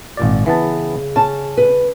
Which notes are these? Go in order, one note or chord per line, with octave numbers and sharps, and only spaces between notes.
G#1 A#2 D5
C#3 E3 B3 A5
C#4 A5
B4